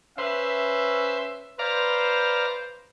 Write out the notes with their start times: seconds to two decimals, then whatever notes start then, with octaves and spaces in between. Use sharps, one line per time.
0.18 C#4 B4 C5 E5
1.59 B4 C5 D5 F5 A#5